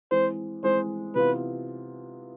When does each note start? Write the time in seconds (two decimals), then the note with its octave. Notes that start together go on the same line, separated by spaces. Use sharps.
0.12 E3 G#3 C4 C5
0.64 E3 G#3 C4 C5
1.16 C3 E3 B3 F4 B4